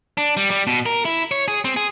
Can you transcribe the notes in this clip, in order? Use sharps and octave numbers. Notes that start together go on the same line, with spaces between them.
D4
G3
G3
B2
A#4
E4
C#5
G#4
C4
G#4